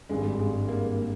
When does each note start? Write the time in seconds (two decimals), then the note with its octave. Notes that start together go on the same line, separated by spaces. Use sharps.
0.09 G#1 G2 G3 G#3
0.39 G#3
0.68 A#3